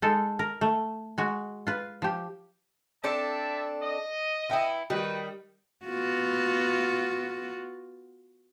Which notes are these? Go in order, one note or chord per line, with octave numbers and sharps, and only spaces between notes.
G#3 D#4 A4
A#4
A3
G#3 F#4
F4 B4
F3 G4
C4 D4 A4 D5 E5 A5
D#5
B3 E4 E5 G5
D#3 G3 F#4 B4
B3 F4 F#4